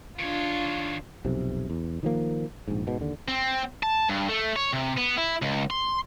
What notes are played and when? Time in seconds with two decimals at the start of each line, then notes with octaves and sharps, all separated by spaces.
0.19 D#3 D4 F4 C#5
1.25 B1 F2 C3
1.70 E2
2.03 D#3 F3 A#3
2.68 A#1 G#2
2.87 G#2 B2
3.00 D#2 D3
3.28 C4
3.83 A5
4.10 G2
4.29 A3
4.56 C#5
4.73 C3
4.97 B3
5.17 E4
5.42 C#2
5.70 C6